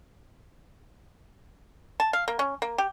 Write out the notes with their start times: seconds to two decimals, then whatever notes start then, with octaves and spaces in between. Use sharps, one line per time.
2.00 A5
2.13 F5
2.28 A#3
2.39 C#4
2.62 A#3
2.78 G4